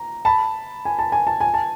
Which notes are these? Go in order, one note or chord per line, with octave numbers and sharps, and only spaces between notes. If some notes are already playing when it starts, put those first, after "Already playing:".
Already playing: A#5
A5 B5
G#5
A5
G#5
A5
G#5
A5